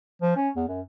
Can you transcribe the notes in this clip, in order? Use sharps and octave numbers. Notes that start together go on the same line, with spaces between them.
F3
C#4
E2
F#2